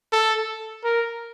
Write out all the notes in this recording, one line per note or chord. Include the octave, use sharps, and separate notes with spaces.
A4
A#4